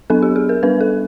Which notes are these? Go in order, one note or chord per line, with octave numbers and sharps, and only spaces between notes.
F#3 B3 D4 A4
G4
G#4
A#4
G3 B3 D4 B4
A4